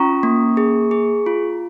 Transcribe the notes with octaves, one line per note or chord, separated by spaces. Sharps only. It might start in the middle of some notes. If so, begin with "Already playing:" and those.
Already playing: C#4 F4 A#5 C#6
A#3
G#4
G#4
F4